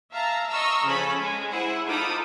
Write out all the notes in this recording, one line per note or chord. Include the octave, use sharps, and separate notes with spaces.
E5 F5 A5 A#5
D#5 A#5 C#6 E6 F6
C#3 F3 C#4 A4 B5
G#3
E4 G#4 C5 F#5
D#4 F4 A4 B5 D6 D#6